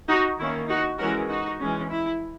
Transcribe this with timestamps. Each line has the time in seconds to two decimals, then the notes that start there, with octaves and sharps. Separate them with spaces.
0.09 D#4 F#4
0.38 D#3 A#3 C#4 E4
0.68 D#4 F#4
0.98 E3 G#3 C#4 F#4 A#4
1.29 D#4 F#4
1.60 E3 G#3 C#4
1.89 E4